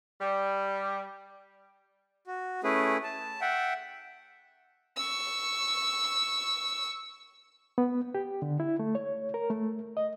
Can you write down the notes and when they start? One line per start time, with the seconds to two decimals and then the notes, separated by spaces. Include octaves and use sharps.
0.20 G3
2.27 F#4
2.64 A3 C#4 E4 G#4 B4
3.03 A5
3.41 E5 F#5 G5
4.96 C#6 E6
7.78 B3
8.15 G4
8.42 D3
8.60 E4
8.79 A3
8.95 C#5
9.34 A#4
9.50 A3
9.97 D#5